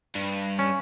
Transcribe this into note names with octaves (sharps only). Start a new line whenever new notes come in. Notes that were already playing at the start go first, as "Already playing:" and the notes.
G2
C#4